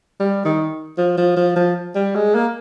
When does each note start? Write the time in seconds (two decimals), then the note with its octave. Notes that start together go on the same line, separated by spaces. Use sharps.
0.20 G3
0.45 D#3
0.98 F3
1.18 F3
1.37 F3
1.56 F3
1.95 G3
2.15 G#3
2.35 A#3